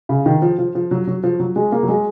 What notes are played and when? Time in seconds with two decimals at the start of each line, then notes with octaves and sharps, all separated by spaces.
0.09 C#3
0.26 D#3
0.42 F3
0.58 F3
0.75 F3
0.91 F#3
1.07 F#3
1.23 F3
1.40 F#3
1.56 G#3
1.72 A#3
1.83 F#3
1.88 G#3